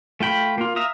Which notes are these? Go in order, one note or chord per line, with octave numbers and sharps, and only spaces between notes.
A3 F4 G5 B5
A#3 F4
E5 F5 A#5 D#6